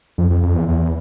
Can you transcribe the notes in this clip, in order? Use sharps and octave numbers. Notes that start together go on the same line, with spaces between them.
F2
F2
F2
E2
E2